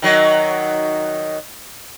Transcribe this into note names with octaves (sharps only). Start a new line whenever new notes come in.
D#3 F#3